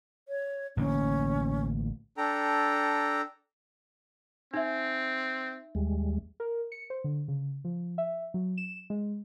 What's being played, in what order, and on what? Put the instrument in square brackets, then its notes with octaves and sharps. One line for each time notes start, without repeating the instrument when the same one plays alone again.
[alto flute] C#5
[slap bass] A1 D3 A#3 [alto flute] C#4
[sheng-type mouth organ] D4 A4 G5 A#5
[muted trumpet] C4 [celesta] D#4 E5
[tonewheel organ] D#2 G3 G#3
[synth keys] A#4
C#7
C5
D3
C#3
F3
E5
F#3
E7
G#3